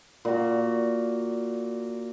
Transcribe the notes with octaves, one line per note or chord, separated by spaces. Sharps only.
A#2 F#4